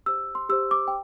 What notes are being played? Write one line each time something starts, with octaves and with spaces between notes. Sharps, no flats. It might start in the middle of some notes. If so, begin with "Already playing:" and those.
G4 C5 E6
C6
G4 C5 E6
D6
G5